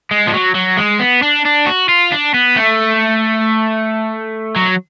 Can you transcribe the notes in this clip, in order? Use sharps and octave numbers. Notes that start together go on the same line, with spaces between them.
G#3
F3
F#3
F#3
G#3
B3
D4
D4
F#4
F4
D4
B3
A3
F#3